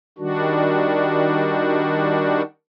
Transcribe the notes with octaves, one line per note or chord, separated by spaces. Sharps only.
D#3 G3 D4 F#4